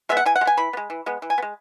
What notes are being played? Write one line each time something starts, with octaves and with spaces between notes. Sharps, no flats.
G#3 B3 E5
F#5
E3 G#5
F#5
G#3
B3 G#5
E3 B5
B3
G#3
E3
G#3 B3
E3
G#5
B3
G#3